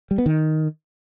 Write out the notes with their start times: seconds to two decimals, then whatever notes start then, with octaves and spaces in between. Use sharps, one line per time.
0.11 G3
0.18 B3
0.26 D#3